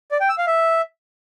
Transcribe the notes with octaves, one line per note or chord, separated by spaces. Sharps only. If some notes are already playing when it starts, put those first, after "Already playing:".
D5
G5
E6
F5
E5